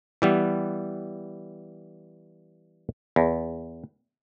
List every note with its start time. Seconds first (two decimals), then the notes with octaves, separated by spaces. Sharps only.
0.22 E3 G3 B3
3.16 E2